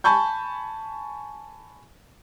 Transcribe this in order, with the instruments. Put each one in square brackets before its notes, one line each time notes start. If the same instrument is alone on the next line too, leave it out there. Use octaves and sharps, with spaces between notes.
[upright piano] G#5 A5 B5 C#6 G6